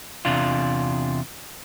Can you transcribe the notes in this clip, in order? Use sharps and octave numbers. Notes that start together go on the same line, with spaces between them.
E2 C3 D4 F4